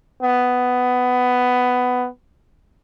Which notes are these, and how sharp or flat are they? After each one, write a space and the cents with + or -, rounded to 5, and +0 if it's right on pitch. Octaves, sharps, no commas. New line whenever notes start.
B3 +10